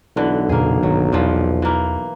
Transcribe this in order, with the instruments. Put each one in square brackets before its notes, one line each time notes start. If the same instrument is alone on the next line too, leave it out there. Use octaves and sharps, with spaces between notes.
[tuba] B1 [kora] D3 E3
[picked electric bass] E2 A#2 C#3 [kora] A#3 G#4
[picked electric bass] G1 D#3 [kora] F#3
[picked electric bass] E2 [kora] A#2 E3 F3
[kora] E3 A#3